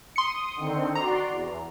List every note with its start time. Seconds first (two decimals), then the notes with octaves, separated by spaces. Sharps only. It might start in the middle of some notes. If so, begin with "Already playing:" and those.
0.16 C6 D#6 C#7
0.56 D3 D#3 C4
0.95 F#4 D5 A#5 C6
1.30 E2